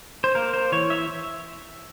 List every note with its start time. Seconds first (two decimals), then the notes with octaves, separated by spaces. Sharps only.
0.24 C5
0.35 A#3 A#4
0.54 C5
0.72 E3 C#5
0.90 E5